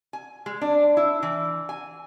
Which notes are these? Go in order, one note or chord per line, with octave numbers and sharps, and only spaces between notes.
G#5
G#3
D4
E4
E3
G#5